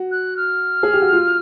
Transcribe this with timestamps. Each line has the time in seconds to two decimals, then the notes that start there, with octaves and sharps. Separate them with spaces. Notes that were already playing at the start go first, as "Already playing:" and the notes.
Already playing: F#4
0.11 F#6
0.36 F6
0.83 G#4
0.93 G4
1.02 F#4
1.13 F4